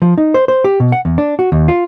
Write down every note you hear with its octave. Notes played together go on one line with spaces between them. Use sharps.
F3
D#4
C5
C5
G4
B2
F#5
E2
D4
F#4
D#2
F4